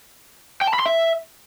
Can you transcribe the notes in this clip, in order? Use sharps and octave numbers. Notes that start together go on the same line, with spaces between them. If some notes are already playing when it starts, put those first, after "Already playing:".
G5
A5
B5
C6
E5